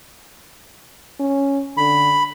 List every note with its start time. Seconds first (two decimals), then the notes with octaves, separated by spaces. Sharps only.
1.19 C#4
1.77 D3 B5